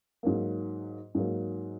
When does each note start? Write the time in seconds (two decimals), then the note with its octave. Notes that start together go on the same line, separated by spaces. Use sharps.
0.23 G#2 F#3 A#3
1.15 G#2 F#3 A#3